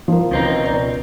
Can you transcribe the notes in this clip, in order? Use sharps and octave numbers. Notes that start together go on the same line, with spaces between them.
F3 A#4
C#2 B2 C4 D#4
D5